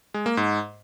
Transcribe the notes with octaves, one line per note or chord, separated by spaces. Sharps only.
G#3
A#3
G#2